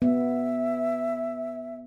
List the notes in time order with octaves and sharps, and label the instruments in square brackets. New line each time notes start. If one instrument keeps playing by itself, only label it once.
[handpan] B3 [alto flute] E5